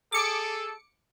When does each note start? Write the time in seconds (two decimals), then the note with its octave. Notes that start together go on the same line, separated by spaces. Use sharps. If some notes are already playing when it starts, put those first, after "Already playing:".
0.12 G#4 A4 D6 C#7